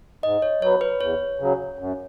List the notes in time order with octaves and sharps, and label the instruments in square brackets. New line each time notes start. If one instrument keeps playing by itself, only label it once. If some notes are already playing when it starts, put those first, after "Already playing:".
[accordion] G#2 [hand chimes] D#5
[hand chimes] C#5
[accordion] F#3 B3 [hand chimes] C#5
[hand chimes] B4
[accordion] E2 [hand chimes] C#5
[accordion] C#3 F#3
F#2